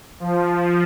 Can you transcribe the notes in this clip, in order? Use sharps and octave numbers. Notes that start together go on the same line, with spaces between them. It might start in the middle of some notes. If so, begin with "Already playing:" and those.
F3